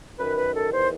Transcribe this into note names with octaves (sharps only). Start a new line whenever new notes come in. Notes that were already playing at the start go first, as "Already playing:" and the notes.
F#2 D#3 B4
B4
A4
E2 D#3 C5